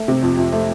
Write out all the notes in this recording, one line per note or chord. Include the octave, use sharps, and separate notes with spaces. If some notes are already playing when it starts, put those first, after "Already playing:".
Already playing: A3
C3
F2
F2
A3